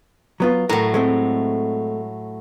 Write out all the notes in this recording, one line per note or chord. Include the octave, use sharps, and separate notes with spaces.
F#3 B3 F4
A2 F#3 A#4
G#3 A3 C4